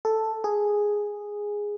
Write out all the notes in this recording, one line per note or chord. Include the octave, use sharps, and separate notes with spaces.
A4
G#4